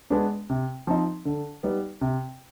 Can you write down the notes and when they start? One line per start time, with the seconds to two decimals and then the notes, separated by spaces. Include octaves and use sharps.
0.10 G#3 B3 D4
0.50 C3
0.87 F3 C4 D#4
1.25 D3
1.63 G3 B3 D#4
2.01 C3